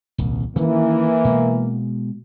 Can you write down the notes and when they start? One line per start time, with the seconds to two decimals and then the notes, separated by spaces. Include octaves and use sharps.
0.18 D#1 C2
0.56 D#3 E3 A#3 C#4
1.25 B2 G#3